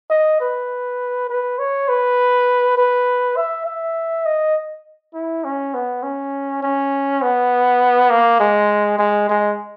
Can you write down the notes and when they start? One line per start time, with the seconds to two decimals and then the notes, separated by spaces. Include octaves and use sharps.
0.10 D#5
0.40 B4
1.30 B4
1.59 C#5
1.89 B4
2.77 B4
3.37 E5
3.66 E5
4.26 D#5
5.14 E4
5.44 C#4
5.74 B3
6.03 C#4
6.62 C#4
7.22 B3
8.10 A#3
8.40 G#3
8.99 G#3
9.29 G#3